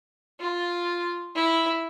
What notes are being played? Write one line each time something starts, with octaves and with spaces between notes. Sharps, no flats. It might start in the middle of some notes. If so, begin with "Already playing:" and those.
F4
E4